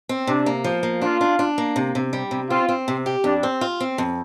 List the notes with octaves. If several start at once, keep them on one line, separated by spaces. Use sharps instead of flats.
C4
C3 D4
A#3
F3
A#3
D4 F4
D4
D4
A#3
C3
C3
G3
C3
C4 F4
C4
C3
G4
F2 D4
C4
F4
C4
F2